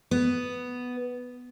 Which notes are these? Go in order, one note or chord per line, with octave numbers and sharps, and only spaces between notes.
B3